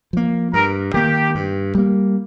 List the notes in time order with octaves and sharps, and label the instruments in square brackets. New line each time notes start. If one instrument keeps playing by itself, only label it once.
[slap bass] F3 A#3
[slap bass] G2 [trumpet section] A#4
[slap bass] D#3 A#3 [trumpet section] G4
[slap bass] G2
G3 A#3